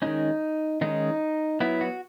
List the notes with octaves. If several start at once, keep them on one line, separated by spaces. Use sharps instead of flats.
D#3 G#3 C#4 D#4
D#3 G#3 C#4 D#4
F#3 B3 E4
F#4